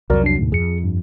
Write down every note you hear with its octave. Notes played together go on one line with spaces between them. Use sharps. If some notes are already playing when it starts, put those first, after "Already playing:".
C2 F2 F#3 F#4 A#4 D5
D4 C7
D2 G#2 B2
F2 G#4 C#7
G2